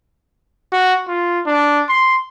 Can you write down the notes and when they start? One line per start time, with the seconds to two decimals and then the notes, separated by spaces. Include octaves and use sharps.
0.72 F#4
1.08 F4
1.47 D4
1.89 C6